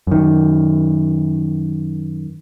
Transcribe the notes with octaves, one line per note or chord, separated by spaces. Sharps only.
F#2 D#3